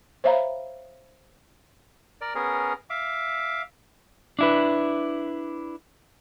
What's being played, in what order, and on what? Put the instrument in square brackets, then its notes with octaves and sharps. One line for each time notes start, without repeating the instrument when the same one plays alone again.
[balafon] C5 C#5 E5 F5 A#5 B5
[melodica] A#4 D5
B3 C#4 G#4 A#4
E5 F5 D6
[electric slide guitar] D4 E4 B4